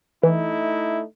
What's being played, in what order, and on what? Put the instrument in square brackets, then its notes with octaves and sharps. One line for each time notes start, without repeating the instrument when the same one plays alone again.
[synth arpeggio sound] E3 [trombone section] A3 D#4 E4